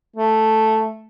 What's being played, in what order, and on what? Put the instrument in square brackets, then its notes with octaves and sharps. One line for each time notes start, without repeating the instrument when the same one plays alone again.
[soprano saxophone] A3